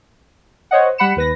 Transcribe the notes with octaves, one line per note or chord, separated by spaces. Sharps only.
C5 C#5 D#5 F#5
G3 F#5 B5 C#7 E7
D#2 B4 A#6